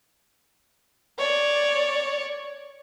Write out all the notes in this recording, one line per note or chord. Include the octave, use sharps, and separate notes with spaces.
C#5 D5